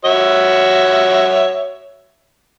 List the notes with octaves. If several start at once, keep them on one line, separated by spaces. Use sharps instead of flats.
F#4 C#5 E5